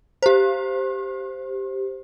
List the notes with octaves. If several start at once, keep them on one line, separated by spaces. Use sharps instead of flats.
G4 C5